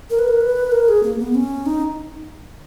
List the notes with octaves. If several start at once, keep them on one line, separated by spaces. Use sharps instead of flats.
A#4
B4
A#4
B4
A#4
G#4
A#3
B3
C#4
D#4